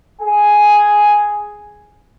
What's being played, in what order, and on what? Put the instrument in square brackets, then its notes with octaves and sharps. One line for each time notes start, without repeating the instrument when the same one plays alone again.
[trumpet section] G#4 G#5